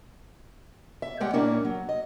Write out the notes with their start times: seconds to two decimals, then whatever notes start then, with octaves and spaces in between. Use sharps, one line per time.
1.02 E5
1.20 G3 G#3 G4 F#5 G5
1.33 A#2 A#3 C#4 D4 E4
1.65 F#3
1.89 D#5